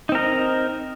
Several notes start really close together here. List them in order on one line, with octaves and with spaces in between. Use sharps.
D#4 C4 A#4 D#5